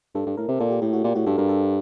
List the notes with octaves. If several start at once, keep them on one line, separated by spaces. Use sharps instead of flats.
G2 A4
G2
A2 A#4
C3
A#2 A4
G4
A2 G4
F#4
A#2 G4
A2 F#4
G2 A4
G2 A#4
A4